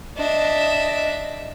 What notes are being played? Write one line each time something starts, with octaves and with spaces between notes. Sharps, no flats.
D4 D#5 E5